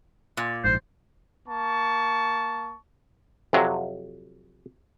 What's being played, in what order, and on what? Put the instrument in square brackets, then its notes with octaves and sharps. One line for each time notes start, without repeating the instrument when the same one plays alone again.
[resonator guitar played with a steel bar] A#2
[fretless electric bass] A#1 G#2 [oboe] C5
[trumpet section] A#3 A5 C#6
[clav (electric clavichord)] F2 C3 F#3